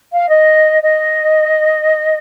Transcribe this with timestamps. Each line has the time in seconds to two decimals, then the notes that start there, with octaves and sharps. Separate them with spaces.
0.12 F5
0.28 D#5
0.82 D#5